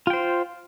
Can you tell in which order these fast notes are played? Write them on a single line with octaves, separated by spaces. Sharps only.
F4 G5 C5